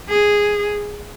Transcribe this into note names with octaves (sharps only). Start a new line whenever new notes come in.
G#4